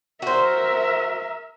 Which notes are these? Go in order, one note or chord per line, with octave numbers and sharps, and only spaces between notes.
F#4 A#4 C5 E5